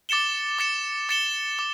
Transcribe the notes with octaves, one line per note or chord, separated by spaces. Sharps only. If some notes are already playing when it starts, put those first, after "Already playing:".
D6 A6 C#7 E7 G7
D6 A6 C#7 E7 G7
D6 A6 C#7 E7 G7
D6